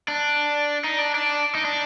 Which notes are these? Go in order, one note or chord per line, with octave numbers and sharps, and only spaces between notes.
D4
D#4
D4
D4
D#4
D4